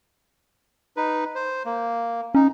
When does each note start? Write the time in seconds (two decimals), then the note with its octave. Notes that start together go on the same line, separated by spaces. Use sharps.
0.97 D#4 B4
1.35 C5
1.66 A#3
2.35 C#4 D#4